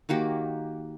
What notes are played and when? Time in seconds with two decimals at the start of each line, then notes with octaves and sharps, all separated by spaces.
0.09 D#3 A#3 F#4 G4